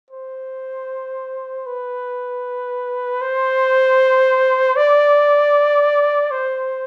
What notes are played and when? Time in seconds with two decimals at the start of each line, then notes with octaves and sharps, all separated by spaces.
0.10 C5
1.66 B4
3.21 C5
4.76 D5
6.31 C5